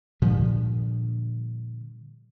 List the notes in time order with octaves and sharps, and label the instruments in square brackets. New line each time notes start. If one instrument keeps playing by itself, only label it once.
[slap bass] A#2 D3 F3 G3